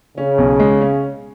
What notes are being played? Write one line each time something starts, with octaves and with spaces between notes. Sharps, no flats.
C#3 C#4
B1
G#3
C#4